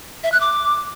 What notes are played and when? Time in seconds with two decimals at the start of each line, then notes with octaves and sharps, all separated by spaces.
0.24 E5
0.32 F#6
0.41 D6